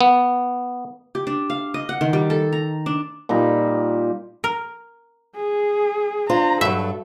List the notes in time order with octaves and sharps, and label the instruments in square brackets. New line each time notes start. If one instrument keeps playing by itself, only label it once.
[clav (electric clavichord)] B3
[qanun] G4
D4
F5
D#5
F#5
D#3
G3
A4
A#5
D4
[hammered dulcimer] A#2 G3 D#4 A#5
[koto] A#4
[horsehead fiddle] G#4
[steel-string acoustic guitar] D4 F4 C5 [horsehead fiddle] A#5
[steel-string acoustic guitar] G2 F#3 [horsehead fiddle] A4 [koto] E5